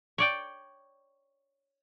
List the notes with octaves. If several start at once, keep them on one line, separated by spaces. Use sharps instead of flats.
C#5 D5 G5